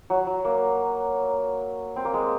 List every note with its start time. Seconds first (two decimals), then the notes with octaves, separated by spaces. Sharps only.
0.10 F#3
0.27 F#3
0.45 A#3
1.96 C4
2.05 A#3
2.14 G#3